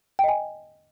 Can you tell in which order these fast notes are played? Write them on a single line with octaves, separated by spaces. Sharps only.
G5 D#5 G#5